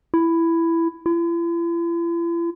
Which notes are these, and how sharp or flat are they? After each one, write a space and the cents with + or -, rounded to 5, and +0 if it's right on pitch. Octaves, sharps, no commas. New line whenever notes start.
E4 +10
E4 +45